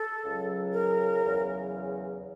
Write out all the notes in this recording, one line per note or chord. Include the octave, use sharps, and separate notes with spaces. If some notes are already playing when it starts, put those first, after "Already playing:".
Already playing: A4
C#2 C#3 F#3
A#4
E2 C#3 F#3